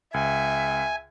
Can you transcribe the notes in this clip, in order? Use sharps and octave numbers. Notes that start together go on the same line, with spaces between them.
C#2 E5 G#5